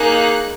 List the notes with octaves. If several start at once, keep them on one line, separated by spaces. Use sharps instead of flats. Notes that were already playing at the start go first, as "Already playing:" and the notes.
Already playing: A#3 D#4 G#4 F#6